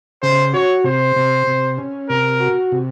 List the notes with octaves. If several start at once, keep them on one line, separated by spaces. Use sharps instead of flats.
C#3 C5
F#4 C#5
C3 C5
C3
C3
C#4
C3 A#4
F#4
C3